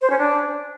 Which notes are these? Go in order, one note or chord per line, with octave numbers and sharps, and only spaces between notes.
C5
C#4
D4